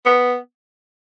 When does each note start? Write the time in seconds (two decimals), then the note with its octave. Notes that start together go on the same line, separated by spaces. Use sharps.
0.06 B3